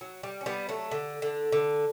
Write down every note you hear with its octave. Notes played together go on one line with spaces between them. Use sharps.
F#3
G3
C#4
G3 B3
F#3 A3
D3
D3
D3